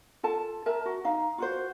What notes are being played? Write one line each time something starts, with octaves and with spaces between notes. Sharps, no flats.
F4 A4 A5
A#4 E5 A5
F#4
D#4 F5
F4 F#4 C5